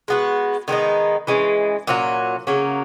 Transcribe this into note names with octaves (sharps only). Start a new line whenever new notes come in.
G#3 B3 F#4
D#3 G#3 B3 D#4
E3 G#3 C#4
A#2 F#3 C#4 F#4
C#3 F#3 A#3 C#4